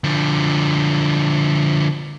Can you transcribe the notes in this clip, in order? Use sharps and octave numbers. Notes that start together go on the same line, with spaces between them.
D3 F3